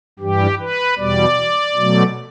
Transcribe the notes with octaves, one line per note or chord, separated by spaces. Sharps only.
G2 E3 G3 G4
B4
E2 B2 G3 D5
B2 F#3 A3